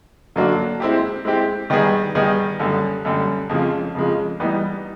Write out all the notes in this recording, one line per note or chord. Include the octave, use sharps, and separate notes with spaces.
D3 F#3 A#3 D4 F#4
G#3 C4 E4 G4
G#3 C4 E4 G4
D#3 G3 B3 D#4 G#4
D#3 G3 B3 D#4 G#4
F#2 D3 G3
F#2 D3 G3
F2 C#3 F3 G#3
F2 C#3 F3 G#3
E3 G3 B3 D#4